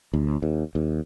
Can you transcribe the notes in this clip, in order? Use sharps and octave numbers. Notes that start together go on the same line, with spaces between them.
D2
D#2
D#2